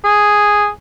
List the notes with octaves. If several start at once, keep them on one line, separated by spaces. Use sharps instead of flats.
G#4